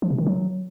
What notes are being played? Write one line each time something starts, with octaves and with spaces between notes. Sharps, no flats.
F3
C3
D#3
F#3